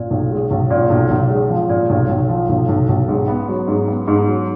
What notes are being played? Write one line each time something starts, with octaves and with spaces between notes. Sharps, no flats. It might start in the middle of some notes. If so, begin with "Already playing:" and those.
Already playing: A#2
B1
G#3
B1
A#2
B1
B1
G#3
F3
A#2
B1
B1
F3
B1
B1
B1
G#2
B3
F#3
G#2
B3
G#2
F#3